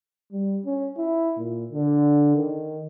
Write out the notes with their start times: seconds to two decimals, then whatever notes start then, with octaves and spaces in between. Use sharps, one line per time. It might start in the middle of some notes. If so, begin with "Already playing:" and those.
0.32 G3
0.66 C#4
0.97 E4
1.38 A#2
1.72 D3
2.36 D#3